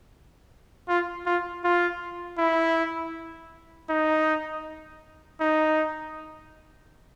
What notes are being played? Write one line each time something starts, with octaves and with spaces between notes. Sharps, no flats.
F4
F4
F4
E4
D#4
D#4